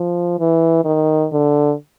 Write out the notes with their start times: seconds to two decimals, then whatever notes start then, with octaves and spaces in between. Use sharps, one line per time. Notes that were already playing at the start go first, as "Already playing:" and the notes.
Already playing: F3
0.39 E3
0.85 D#3
1.32 D3